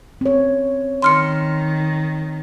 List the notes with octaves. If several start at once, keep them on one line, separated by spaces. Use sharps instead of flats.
C4 C#5
D#3 C6 F6 C#7